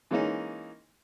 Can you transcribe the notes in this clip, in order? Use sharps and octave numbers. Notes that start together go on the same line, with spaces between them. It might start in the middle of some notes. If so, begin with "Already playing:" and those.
E3 G#3 A#3 C#4 D#4